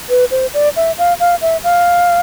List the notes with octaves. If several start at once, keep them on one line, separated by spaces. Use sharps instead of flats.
B4
C5
D5
E5
F5
F5
E5
F5